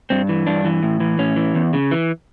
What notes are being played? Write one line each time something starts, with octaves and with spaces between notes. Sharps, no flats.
G2 C4
E3
G2 D4
E3
A2
E3
A2 C#4
E3
E2
C#3
E3